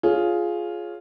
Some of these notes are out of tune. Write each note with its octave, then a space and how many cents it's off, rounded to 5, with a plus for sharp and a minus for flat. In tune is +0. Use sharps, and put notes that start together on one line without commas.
F4 +0 G#4 +10 C#5 +0